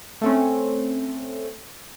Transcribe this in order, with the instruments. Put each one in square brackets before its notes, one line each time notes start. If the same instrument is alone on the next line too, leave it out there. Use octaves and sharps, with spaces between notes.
[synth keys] A3 C4 C#4